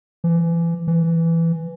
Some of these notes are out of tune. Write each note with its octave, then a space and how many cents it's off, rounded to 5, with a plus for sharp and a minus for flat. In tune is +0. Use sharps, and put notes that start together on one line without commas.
E3 +30
E3 +10